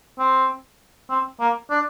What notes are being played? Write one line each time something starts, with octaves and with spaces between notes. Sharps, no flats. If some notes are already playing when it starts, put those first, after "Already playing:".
C4
C4
A#3
D4